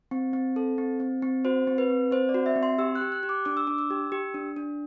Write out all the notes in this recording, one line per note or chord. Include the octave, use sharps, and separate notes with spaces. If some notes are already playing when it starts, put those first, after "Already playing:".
C4
C4
A4
C4
C4
C4
F#4 C5
C4
B4
C4
C4 C5
D5
F#4
E5
C4
C6
G4 E6
F#6
G4
F#6
G4
D6
D4 D6
E6
D4 D6
E6
G4
G4
D4
D4